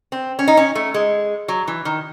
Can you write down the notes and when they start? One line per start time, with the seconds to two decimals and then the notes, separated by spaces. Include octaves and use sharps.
0.12 C4
0.39 C#4
0.48 D#4
0.57 C#4
0.75 A3
0.94 G#3
1.48 F#3
1.68 E3
1.85 D#3